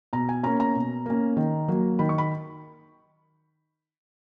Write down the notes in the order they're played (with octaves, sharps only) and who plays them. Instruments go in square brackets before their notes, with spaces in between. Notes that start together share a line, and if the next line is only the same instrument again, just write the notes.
[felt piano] B2 A#5
G#5
A#3 C#4 A#5
A#5
B2
A#3 C#4
D#3
F#3 A#3
D#3 B5
C#6
B5